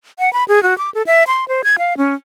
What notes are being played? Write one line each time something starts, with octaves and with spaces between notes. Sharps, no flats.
F#5
B5
G#4
F#4
D6
A4
E5
C6
C5
G#6
F5
C#4